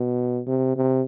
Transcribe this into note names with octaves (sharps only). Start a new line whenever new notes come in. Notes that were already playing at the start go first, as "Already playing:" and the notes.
Already playing: B2
C3
C3